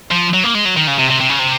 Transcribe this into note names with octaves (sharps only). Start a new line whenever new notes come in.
F3
F#3
A#3
G#3
F#3
D#3
C#3
C3
C3
C3
C#3
C3